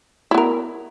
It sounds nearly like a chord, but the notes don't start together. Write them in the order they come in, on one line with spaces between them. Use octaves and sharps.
E4 B3 A#4